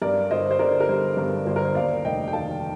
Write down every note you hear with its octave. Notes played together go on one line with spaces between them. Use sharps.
G2 A#4 D5
G1 C5 D#5
C5
D3 A#4 D5
A#4
G3 C5
G2 A#4
G1 C5
A#4
C5
D#2 D5 F5
F1 D#5 G5
G5
D#3 F5 A5